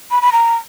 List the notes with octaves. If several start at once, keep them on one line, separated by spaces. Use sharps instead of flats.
B5
B5
A#5